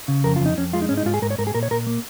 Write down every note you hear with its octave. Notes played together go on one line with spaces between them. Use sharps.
C#3
F2 A#4
F4
F2
D#4
F2 C#4
G#3 F4
D#4
G#2 C#4
D#4
G#2 F4
G#4
G#2 A#4
C#5
G#2 A#4
G#4
A#2 A#4
C#5
A#2 A#4
A#3